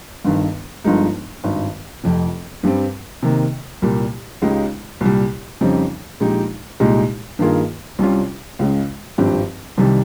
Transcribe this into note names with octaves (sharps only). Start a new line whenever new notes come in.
G1 G2 D#3
G1 G2 F3 G#3 D#4
G#1 G2 D#3
F1 F2 C3
G2 G3 C4
C3 D#3 A#3
C2 A#2 G3 A#3
C#2 C#3 G#3 D#4 G4
C2 A#2 G3
F2 C#3 G3 C4 D#4
A#1 A#2 G#3 D#4 G4
C2 A#2 G#3 D#4 G4
G2 D#3 A#3 F4 G#4
C2 C3 G3 C#4 F4
C#2 C#3 G#3
G#1 G2 F3 C4 G4
C2 C3 D#3 G3